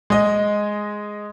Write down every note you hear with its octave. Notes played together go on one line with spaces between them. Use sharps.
G#3 D#5